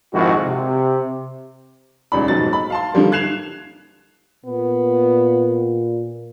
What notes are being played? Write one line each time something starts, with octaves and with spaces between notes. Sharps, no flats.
A#1 F2 G#2 D#3 E4 F#4
C3
D#1 C#2 D#4 D5 B5
F1 G#2 B2 F#3 A6
B5
F5 A5 C6
D3 D#3 F3 G3 A#3
F#6 G#6 C7 E7 F7
A#2 B3